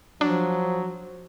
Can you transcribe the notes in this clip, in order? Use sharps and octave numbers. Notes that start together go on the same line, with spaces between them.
F3 F#3 D4